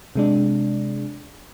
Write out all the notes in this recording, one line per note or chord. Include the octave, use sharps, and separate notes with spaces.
C3 G#3 D4